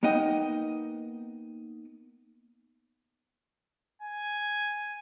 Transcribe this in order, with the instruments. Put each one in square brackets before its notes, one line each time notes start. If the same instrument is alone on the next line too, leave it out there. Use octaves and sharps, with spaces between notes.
[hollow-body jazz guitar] A#3 B3 D#4 D#5 G5
[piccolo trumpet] G#5